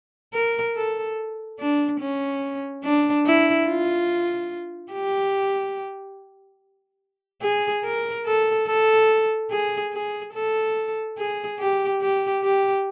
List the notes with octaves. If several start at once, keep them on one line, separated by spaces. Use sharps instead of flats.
A#4
A4
D4
C#4
D4
E4
F4
G4
G#4
A#4
A4
A4
G#4
G#4
A4
G#4
G4
G4
G4